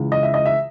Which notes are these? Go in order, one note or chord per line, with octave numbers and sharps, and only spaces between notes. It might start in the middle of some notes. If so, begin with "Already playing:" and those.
Already playing: C#2 C#3 E3 G#3
D#5
E5
D#5
E5